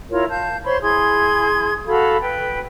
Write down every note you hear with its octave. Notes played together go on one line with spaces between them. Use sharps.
E4 F4 A#4 C#5
F5 A5 G6
C5 C#5 B5 C6
E4 G#4 C6 G#6
F#4 A4 F5 B5
B4 G5